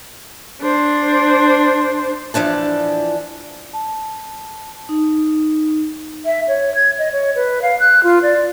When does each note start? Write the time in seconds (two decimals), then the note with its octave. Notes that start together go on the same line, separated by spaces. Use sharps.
0.62 D4 C5
2.34 E3 F3 D4 A5
3.73 A5
4.89 D#4
6.25 E5
6.48 C#5
6.75 G#6
6.99 D#5
7.12 C#5
7.36 B4
7.62 F5
7.80 F#6
8.03 F4
8.23 D5